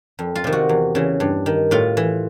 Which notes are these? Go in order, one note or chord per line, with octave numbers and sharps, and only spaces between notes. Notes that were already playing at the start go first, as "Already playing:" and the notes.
F2
F4
C3 D#3
F#4
E2
C#3 E3
G2
D#3
A2 F4
E3